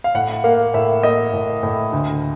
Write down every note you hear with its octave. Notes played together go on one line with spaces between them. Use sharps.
F5
A2 F#5
A#3 F5
A2 E5
A#3 D#5
A2
A2
D2